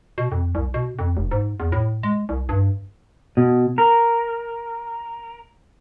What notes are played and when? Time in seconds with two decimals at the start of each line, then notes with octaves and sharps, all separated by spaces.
0.18 B2
0.32 F2
0.55 C2
0.74 B2
0.99 F2
1.17 F1
1.31 G#2
1.60 E2
1.72 A2
2.03 G#3
2.29 C2
2.49 G2
3.37 B2
3.78 A#4